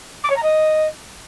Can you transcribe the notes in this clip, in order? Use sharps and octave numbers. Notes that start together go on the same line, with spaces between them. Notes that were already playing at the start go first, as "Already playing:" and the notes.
D6
C#5
A#5
D#5